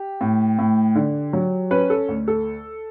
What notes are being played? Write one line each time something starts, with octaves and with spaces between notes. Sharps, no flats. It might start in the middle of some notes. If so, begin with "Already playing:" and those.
Already playing: G4
A2
A2
D3
F#3
C#4 B4
A4
D2
A4